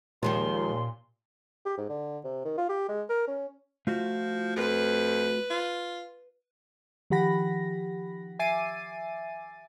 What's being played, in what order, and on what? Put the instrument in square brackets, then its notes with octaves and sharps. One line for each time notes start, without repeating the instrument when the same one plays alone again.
[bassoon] D#2 [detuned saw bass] A#2 [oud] D#3 F3 G#3 [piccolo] C6
[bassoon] G4
G#2
D3
C3
D#3
F4
G4
G#3
A#4
C#4
[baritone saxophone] F3 [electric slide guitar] A3 F4 F#4
[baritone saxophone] F2 [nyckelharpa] B4
[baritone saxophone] F4
[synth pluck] D#3 F3 G4 F#5 B5 A#6
E5 G#5 D6 A6 C7 D#7